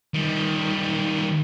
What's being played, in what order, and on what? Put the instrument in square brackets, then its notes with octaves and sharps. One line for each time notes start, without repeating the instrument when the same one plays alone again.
[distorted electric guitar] D#3 G3